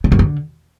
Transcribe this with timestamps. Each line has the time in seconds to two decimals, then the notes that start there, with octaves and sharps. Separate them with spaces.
0.04 C#3
0.12 F#2
0.19 D3